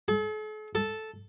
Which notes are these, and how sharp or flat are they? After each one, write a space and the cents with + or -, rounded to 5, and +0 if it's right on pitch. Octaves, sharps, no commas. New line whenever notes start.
A4 -45
A4 -5